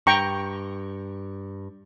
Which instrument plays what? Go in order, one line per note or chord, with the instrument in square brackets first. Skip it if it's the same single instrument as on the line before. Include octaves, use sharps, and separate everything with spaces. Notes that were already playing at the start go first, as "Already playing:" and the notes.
[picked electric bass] G2 [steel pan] G5 A#5 C#6